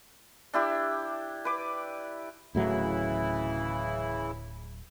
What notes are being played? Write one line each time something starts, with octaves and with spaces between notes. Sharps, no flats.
D4 E4 G4
B4 D6
D1 A2 C#3 E3 F#3 E4